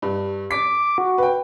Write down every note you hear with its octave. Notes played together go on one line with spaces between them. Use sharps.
G2
D6 B6
F#4
B4 G5